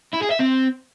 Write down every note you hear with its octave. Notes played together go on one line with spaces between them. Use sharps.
E4
G#4
E5
C4